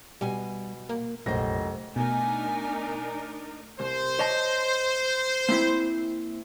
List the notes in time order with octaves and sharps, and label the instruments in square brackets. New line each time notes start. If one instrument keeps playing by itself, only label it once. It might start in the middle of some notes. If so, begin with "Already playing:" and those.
[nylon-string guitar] B2 G#5 [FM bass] G3
[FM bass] A#3
[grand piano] F1 A#6 [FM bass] A#1 [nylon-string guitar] F#2 C5
[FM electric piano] B2 [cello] A3 [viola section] D4 D#4 A#4 [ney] G#5
[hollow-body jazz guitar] C2 [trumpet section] C5
[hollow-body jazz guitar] C#5 D#5 A5
A#3 C4 E4